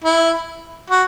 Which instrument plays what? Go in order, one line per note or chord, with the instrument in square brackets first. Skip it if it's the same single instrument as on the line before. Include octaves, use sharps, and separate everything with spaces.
[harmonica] E4
F#4